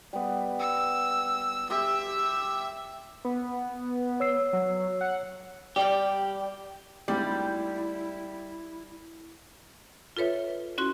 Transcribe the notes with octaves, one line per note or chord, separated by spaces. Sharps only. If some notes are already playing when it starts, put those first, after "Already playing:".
G3 B3
E6
G4 E5 C6 E6
B3
C#5 E6 C7
F#3
F#5
G3 G4 D5
G#1 D2 G3 E4 D6
F4 A4 B4 C#5 E5
C#4 E4 F#4 C6 F#6